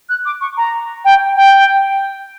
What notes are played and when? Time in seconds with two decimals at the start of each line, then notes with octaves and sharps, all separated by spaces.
0.09 F#6
0.26 D6
0.41 C#6
0.57 A#5
1.05 G5
1.36 G5